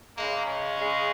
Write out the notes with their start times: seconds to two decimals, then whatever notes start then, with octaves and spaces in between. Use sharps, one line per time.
0.17 C#3 G#3 A#3
0.46 C#4
0.76 C#3 G#3